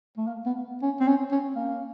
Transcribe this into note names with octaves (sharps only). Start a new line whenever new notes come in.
A3
A#3
B3
C#4
C4
C#4
C#4
A#3